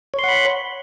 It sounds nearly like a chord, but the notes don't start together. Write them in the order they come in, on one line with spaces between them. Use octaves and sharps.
C#5 C6 F#5 B5